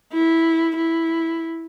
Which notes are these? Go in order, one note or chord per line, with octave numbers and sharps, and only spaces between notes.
E4
E4